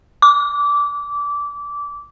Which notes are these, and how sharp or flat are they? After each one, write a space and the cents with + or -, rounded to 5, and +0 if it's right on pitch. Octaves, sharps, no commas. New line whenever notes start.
D6 -20